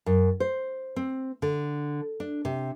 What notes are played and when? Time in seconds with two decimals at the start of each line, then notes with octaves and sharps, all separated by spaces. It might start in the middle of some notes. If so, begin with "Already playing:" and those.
0.06 F#2
0.40 C5
0.96 C4
1.42 D3
2.20 D4
2.45 C3